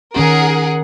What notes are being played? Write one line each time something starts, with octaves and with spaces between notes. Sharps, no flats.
D#3 C#4 G#4 A#4 F#5